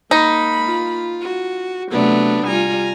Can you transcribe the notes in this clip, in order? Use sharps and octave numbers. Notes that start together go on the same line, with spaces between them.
A#3 D#4 B5
F4
F#4
C3 F#3 A3 B3 D4
G3 F4 G#5 A#5